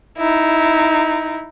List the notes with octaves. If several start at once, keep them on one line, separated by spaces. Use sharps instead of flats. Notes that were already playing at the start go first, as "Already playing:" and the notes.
D#4 E4